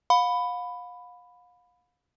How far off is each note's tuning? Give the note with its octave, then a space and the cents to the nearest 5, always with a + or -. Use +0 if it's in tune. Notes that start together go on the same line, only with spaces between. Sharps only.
F5 +40 B5 +10